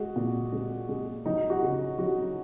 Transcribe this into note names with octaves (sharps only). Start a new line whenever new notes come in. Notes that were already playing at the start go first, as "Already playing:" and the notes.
Already playing: G#3 F#4
A#2
G#3
G#3
F#3 D#4
F#4
C#3
F#3 F#4